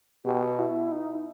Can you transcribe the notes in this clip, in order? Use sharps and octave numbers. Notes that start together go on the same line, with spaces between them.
B2 G4
F#4
E4
D#4